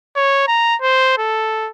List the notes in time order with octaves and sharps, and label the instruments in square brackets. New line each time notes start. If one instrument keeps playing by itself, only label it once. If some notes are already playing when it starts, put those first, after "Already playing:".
[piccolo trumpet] C#5
A#5
C5
A4